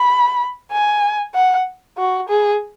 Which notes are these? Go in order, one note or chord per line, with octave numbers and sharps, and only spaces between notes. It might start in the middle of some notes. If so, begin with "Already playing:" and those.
Already playing: B5
G#5
F#5
F#4
G#4